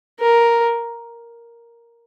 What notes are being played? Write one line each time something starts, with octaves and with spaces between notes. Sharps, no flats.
A#4